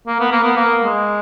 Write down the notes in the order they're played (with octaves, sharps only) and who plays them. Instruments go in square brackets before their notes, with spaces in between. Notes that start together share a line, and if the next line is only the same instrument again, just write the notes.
[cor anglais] A#3
B3
A#3
B3
A#3
G#3